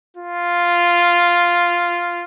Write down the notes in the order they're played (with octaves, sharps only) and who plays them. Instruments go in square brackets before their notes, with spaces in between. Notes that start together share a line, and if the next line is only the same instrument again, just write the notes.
[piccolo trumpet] F4